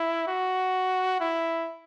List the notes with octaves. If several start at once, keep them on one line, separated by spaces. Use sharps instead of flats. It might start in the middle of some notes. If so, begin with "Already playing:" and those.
Already playing: E4
F#4
E4